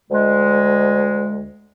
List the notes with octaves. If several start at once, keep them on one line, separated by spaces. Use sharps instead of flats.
D2 G#3